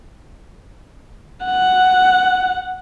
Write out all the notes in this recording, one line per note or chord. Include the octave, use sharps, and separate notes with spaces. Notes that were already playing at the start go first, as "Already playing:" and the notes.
F#5